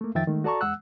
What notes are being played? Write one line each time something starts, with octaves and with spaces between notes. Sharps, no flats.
A3 A#3
F2 D#3 F3 E5 G5 A6
D#3 G#3 A3
F#4 A4 D5 A5 A#5 C#6
E2 G#3 F#5 E6 F#6